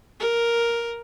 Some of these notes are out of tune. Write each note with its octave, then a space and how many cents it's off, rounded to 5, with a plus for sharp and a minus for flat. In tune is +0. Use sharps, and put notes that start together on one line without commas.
A#4 +5